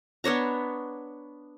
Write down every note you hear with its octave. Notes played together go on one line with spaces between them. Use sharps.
B3 D4 C#5 A#5